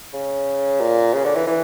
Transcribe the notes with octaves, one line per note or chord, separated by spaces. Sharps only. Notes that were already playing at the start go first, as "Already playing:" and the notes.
C#3
A#2
C#3
D3
E3
E3